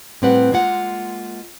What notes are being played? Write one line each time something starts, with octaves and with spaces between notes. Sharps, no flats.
A2 G3 C4 G4 B4 F#5
G#3 A#3 F4 F#5